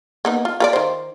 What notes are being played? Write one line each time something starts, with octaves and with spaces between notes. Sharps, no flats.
A#3 B3 D#4
F4
F4 B4 D5
D#3 C5